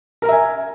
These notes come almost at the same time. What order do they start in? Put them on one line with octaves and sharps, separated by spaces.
A#4 A#5 E5 G#5